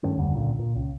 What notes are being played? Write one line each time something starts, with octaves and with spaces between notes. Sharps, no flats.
G2 D#3 A3 C#4
F#1 D#2 D3 G3
C#2 A#2 D3
A#2
C#2